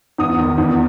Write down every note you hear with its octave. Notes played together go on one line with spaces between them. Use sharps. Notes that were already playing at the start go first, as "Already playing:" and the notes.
E2 D#6
D#3
E2